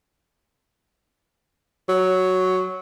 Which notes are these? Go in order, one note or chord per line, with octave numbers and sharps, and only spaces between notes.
F#3